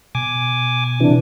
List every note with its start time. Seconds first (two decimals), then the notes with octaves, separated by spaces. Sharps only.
0.15 B2 G#5 D6
1.00 C3 E3 D4